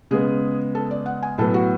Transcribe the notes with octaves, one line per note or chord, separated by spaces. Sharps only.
C#3 G#3 B3 G#4
A4
D5
F#5
G#5
A2 F#3 B3 A4
F#4